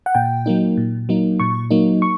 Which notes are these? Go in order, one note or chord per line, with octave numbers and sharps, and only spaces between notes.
F#5
A#2 G5
F#3 A#3 D#4
A#2
F#3 A#3 D#4
A#2 C#6
F#3 A#3 D#4
C#6